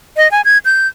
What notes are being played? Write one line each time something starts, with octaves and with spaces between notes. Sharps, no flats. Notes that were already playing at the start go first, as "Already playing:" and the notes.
D#5
G#5
G#6
G6